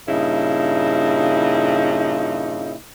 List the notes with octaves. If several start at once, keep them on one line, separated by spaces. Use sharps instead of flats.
G2 A#2 C#3 D#4 E4